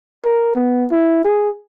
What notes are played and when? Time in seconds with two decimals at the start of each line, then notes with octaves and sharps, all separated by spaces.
0.25 A#4
0.55 B3
0.91 E4
1.25 G#4